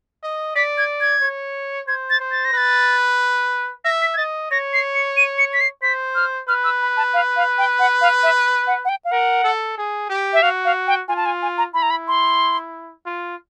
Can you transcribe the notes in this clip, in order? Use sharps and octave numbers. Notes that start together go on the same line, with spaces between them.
D#5
D5 B6
G#6
G#6
C#5
C5 G#6
A6
C5
A6
A#6
B4 A6
E5 A#6
B6
G#6
D#5 A6
C#5 A#6
C7
C#7
D#7
C#7
B6
C7
C5 B6
F6
B4 F6
E6
B5
A5
F5
F5
G5
F#5
F5
E5
F#5
F#5
G5
F5
A#4 F#5
A4
G#4
G4
E5
F#4 F5
F5
G5
F4 G#5
A5
G#5
G#5
A#5
E4 B5
A#5
B5
C6
F4